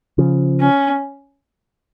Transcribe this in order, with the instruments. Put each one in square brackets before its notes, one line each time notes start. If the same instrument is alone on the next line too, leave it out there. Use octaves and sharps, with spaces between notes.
[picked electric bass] C#3 F3
[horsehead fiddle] C#4